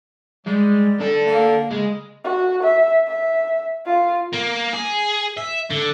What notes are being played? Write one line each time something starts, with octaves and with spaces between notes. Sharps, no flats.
G3 G#3
D4 A4
A#3
C#3 G#3
F#4
E5
E5
F4
A#3
G#4
E5
D3